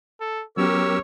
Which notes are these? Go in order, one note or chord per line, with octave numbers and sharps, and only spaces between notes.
A4
F#3 B3 C#4 G4 A#4 C#5 E6